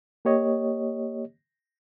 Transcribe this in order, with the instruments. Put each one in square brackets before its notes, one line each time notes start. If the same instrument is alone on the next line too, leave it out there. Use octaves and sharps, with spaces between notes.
[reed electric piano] A#3 G4 C#5 D#5